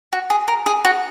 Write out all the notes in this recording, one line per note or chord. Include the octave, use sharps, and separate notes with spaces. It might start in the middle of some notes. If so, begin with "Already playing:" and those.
F#4
G#4
A#4
G#4
F#4